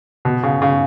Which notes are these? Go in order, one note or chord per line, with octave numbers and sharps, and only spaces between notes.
B2
C#3
C#3